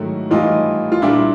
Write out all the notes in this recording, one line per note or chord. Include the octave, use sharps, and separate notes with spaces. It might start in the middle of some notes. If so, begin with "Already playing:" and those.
Already playing: G#2 D#3 F#3 A3 E4 F#4
A2 E3 G3 D#4 F4
F4
A#2 G3 D4 E4